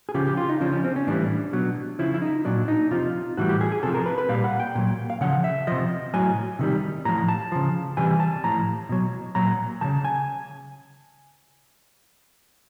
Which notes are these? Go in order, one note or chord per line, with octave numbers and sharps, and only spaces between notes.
G#4
C#3 F3 G4
G4
F4
D#4
C#3 F3 D4
C#4
C4
C#4
A2 E3 G3 D4
B2 F#3
C#3 F3 E4
E4
D#4
A#2 F#3 D4
D#4
C3 F3 F4
A2 E3 G3 F#4
G4
G#4
G#4
C3 F3 A4
A#4
B4
B4
A#2 G3 F5
F#5
G5
A#2 F#3
F5
C#3 F3 F#5
E5
C3 F3 D#5
A2 F#3 G#5
C3 D#3 G3
A2 F3 A#5
A5
C#3 F3
C3 E3 G3 G#5
A5
A2 F3 A#5
B2 F#3
A#2 F#3 A#5
C#3 F3 A5
G#5